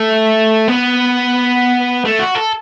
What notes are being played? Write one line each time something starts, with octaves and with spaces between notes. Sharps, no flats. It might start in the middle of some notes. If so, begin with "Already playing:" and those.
Already playing: A3
B3
A3
F#4
A4